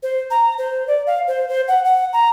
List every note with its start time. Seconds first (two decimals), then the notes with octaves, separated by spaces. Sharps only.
0.03 C5
0.31 A#5
0.58 C5
0.87 D5
1.07 F5
1.28 C5
1.49 C5
1.68 F#5
1.85 F#5
2.13 A#5